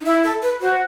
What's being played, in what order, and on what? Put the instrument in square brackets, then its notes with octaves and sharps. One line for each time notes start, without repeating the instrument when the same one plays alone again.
[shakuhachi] D#4
[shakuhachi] E4 [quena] E5
[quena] A4
B4
[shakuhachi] F#4 [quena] C5